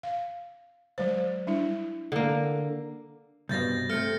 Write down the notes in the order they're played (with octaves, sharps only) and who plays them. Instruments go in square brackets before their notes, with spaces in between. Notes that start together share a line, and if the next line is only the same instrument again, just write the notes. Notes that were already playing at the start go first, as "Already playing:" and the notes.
[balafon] F5
F#3 G#3 C5
G3 D4 E4
[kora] D3 A#3
[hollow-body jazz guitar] C2 G2 B2 [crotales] G6 A6 A#6
[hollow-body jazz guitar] C3 A3 [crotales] F6 C#7